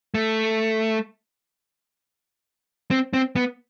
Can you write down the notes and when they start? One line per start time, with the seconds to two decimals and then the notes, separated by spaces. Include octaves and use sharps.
0.14 A3
2.91 C4
3.13 C4
3.36 B3